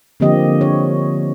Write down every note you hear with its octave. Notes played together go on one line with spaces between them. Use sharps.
D3 F3 A#3 C4 G4 D#5
C#5